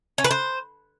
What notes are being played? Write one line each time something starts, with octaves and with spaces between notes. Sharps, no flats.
C#4
B4
C5